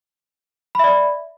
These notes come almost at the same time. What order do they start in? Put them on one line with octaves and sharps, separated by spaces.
B5 E5 D5